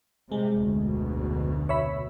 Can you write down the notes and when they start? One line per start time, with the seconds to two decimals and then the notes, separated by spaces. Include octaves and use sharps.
0.32 C3 G3 G#3
0.62 F1 D2 B2
1.69 C#5 E5 B5